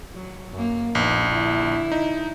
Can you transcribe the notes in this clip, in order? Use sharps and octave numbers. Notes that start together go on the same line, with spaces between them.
F#3
F#2 A#3
A#1 B3 D#4
D3 E4
D#4